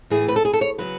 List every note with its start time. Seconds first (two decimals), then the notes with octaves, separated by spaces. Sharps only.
0.10 A2 E3 A3 G#4
0.28 B4
0.36 A4
0.45 G#4
0.53 A4
0.61 C#5
0.78 C#3 F#3 B3 B4